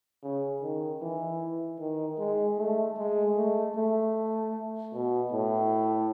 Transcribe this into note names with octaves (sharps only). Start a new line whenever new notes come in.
C#3
D#3
E3
D#3
G#3
A3
G#3
A3
A3
B2
A2